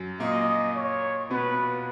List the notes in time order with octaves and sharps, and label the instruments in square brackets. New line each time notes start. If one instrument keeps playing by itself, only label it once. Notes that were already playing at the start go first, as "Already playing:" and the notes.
Already playing: [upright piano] F#2 F#3
[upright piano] A#2 A#3 [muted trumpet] D#5
[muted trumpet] C#5
[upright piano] B2 B3 [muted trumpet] B4